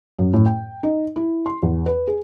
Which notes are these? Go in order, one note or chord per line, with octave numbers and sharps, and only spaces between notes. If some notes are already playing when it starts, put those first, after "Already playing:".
F#2
A2
G5
D#4
E4
C6
E2
B4
G#4